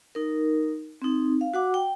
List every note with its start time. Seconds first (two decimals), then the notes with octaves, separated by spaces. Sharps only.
0.15 D#4 A#4
1.02 C4 D#4
1.41 F5
1.54 F#4 F#5 D6
1.74 G5